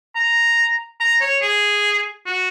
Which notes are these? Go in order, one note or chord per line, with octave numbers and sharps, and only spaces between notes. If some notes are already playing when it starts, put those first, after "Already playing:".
A#5
A#5
C#5
G#4
F#4